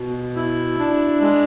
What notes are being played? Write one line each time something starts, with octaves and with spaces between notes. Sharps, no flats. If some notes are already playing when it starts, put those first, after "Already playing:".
Already playing: B2
E4
D4
G#3